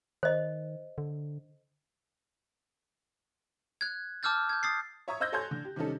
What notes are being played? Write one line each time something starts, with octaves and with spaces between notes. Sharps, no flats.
D#3 C5 D#5
D3
F#6 G#6
A5 D6 E6 F6 G6 A6
G6 G#6
D#6 A6 C7
C#5 E5 A#5 C#6 D#6 G#6
C5 D#5 E6 F#6 G6 A#6
A4 C#5 G#5 C6 G6
D3
G4
C3 D#3 G3 C#4 D#4 A4